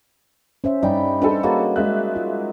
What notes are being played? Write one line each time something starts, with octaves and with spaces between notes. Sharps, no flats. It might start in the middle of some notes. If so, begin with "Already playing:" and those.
C#4 C5 E5
G2 G3 D#4 D5 G5 B5
D4 A4 B4 C5 B5
A#3 F#4 G#4 C#5 A5
G#3 E5 F#6
F4